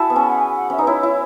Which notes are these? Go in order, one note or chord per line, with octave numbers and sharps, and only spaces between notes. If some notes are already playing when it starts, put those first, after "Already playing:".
Already playing: E4 F#4 G#4 A5
B3
C#4
F#5
G#5
F#5
C#4 E5
D#4 B4
E4 C#5
E4